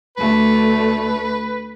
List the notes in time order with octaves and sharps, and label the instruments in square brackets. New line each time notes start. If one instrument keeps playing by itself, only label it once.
[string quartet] D2 D3 A3 [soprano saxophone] B4